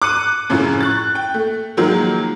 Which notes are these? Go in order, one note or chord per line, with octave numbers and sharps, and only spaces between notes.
D6 F#6 C#7 D#7
F#2 A2 C#3 F3
C#6 F#6 A6
G5
A3
D#3 F3 F#3 G#3 A#3